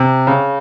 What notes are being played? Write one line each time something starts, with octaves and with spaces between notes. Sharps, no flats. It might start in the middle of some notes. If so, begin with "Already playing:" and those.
Already playing: C3
C#3